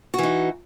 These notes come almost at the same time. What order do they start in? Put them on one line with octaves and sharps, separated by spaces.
F#4 E3 D#4